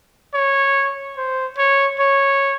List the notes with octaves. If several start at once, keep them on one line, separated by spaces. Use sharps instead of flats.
C#5
C5
C#5
C#5